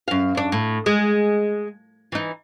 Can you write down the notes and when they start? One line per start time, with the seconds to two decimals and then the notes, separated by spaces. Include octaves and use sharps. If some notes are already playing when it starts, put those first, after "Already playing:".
0.08 F#2 F5
0.35 F#2 D4
0.52 A2
0.86 G#3
2.12 E3 D#4